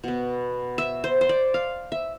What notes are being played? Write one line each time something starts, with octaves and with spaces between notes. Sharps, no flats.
B2 B3
E5
C5
C5
D5
F5
E5